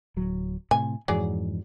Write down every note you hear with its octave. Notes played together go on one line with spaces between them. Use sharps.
D1 F#3
A2 C3 G#5
F2 G#2 E3 F#3 G#4 D5